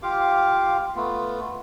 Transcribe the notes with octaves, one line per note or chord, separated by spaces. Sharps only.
F4 G4 F5 D6
A3 B3 F4